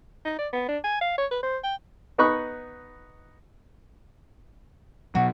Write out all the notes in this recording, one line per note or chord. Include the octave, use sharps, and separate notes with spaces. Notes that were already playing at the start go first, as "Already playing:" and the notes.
D#4
D5
B3
D4
G#5
F5
C#5
B4
C5
G5
B3 D#4 D#5 B5 C#6 F#6
B2 F#3 F#4